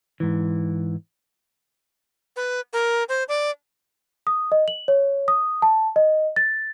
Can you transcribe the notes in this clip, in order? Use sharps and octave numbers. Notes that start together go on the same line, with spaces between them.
G#2 E3
B4
A#4
C5
D5
D#6
D#5
F#7
C#5
D#6
A5
D#5
A6